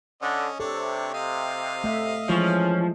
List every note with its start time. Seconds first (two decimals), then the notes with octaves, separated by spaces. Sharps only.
0.22 D3 C#4 D#5
0.60 C3 D4 A4 C#5
1.14 D#5 F5
1.84 A3 E5
2.29 E3 F3 G#3 C#4